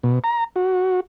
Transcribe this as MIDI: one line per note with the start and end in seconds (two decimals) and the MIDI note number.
0.03 0.19 47
0.24 0.44 82
0.56 1.00 66